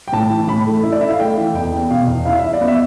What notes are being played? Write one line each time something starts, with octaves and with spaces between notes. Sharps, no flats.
G5
A2 A5
E3
A2 B5
A3
E4
D5
E4 E5
F5
A3 G5
E3
E2 G5
B3
B2 F5
E2
E4 F5
E4 E5
D5
B3
E5